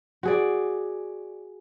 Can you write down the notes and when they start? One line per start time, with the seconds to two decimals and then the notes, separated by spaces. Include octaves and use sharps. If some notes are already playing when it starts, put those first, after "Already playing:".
0.23 F#4 G#4 D5